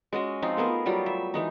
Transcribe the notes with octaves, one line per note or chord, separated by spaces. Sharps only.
G#3 C#4 F#4 D#5
F3 C4 D#4 F4
A3 B3 G#4 A#4
F#3 G3 F4 G4
E5
E3 G#3 D#4